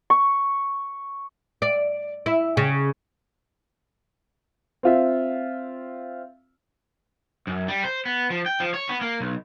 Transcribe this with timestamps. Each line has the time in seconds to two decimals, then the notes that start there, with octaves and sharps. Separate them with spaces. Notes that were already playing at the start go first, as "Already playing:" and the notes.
0.10 C#6
1.62 D5
2.26 E4
2.57 C#3
4.83 C4 F4 E5
7.47 F#2
7.68 G3
7.84 C5
8.05 B3
8.30 F3
8.46 G5
8.60 F3
8.74 C#5
8.89 B3
9.01 A#3
9.20 B1